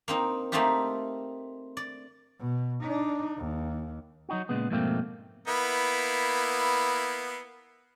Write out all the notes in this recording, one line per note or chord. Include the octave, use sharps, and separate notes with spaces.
A#3 C4 D#4
A3 A#3 C4 D#4 F4 G4
D5
B2
D4 D#4
D#2
F#3 D#4 F#4
A#2 C#3 G#3 B3
F2 G#2 B2 A3 A#3 C4
A#3 B3 E4